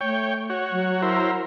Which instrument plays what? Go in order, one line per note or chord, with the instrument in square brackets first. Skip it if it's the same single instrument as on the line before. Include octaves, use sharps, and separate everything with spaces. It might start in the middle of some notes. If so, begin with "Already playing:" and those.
[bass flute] A3 [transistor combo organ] C#5 G5
[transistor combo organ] F#4 C#5
[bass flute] F#3
[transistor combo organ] E4 A#4 C5